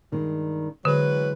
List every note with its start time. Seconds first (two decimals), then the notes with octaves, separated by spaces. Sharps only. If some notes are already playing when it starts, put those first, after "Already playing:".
0.12 G2 D#3 G#3
0.85 D3 E3 F#3 G#3 B4